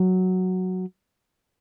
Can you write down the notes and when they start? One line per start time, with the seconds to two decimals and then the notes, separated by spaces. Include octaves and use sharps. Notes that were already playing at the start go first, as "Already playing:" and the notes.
Already playing: F#3